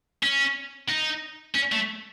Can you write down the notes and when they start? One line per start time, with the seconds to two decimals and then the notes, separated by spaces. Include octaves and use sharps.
0.23 C#4
0.89 D#4
1.55 C#4
1.72 A3